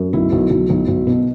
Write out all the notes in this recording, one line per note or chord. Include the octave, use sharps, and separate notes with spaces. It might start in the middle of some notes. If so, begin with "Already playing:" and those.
Already playing: F#2
B1 E4
B1
B1
B1
B1
B2